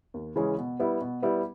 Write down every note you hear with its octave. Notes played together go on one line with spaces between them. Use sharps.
D#2
C#3 E3 G#3 C#4
B2
G3 B3 E4
B2
G3 B3 E4